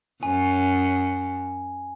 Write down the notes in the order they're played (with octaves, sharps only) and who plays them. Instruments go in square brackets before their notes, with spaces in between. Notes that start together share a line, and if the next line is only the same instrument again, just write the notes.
[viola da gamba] F#2 [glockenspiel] G#5